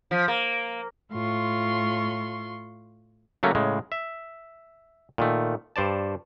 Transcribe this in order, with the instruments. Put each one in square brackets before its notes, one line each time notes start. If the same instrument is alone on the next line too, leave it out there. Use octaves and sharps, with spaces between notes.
[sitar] F3
A#3
[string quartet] A2 F4 C6 C#6
[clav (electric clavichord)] C#3 F#3 A3 A#3 C#4
A2 C#3 G#3
E5
A#2 D#3 A3
G2 C5 D5 A5